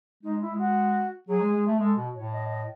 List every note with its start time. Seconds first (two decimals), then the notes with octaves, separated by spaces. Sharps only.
0.23 G#3 D#4
0.41 E4
0.50 G#3
0.58 F#4
1.28 F#3 G#4
1.40 G#3
1.53 G#3
1.67 A3
1.80 G#3 A4
1.97 B2
2.14 A2 C#5
2.32 D#5
2.49 D#5